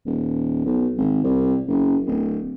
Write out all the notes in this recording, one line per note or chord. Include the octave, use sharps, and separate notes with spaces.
D#1
B1
G#1
C2
F#1
D1